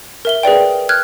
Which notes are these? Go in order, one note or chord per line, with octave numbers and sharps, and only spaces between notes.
A#4 E5 G7
G#4 B4 D5 G5
F6 F#6 G#6